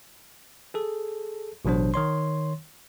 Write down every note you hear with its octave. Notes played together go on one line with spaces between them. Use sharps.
G#4 A4
A1 B2 F#3 D4 C5
D#3 C#5 C6